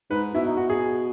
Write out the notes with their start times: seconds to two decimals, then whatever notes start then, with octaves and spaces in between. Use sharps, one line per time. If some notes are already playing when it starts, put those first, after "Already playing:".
0.10 G#2 B4
0.34 B2 E4
0.46 D#4
0.57 F#4
0.70 G#4